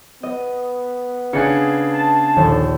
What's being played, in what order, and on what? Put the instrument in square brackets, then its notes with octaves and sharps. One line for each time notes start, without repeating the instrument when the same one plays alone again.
[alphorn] B3 [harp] D#5
[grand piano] C#3 D4 G#4 [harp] A6 C#7
[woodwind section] A5
[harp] A#1 D#2 [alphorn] D3